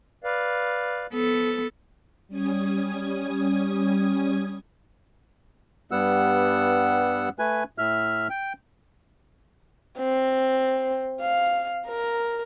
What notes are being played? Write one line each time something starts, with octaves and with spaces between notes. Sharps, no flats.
B4 D5 F5
F3 B3 A4
G3 C#4 D#6 G#6
G2 G3 B3 F#5 E6
A3 B4 G#5
A2 E5 F6
G5
C4
F5
A#4